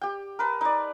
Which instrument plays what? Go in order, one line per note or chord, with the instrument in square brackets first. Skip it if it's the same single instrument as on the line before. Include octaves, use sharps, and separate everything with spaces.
[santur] G4 G5
A#4 B4 A5
D#4 D5